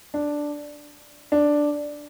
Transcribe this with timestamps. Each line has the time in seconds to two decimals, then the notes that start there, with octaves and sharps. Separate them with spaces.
0.14 D4
1.32 D4